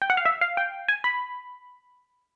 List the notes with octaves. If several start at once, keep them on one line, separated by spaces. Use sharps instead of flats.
G5
F#5
F5
E5
F5
G5
G#5
B5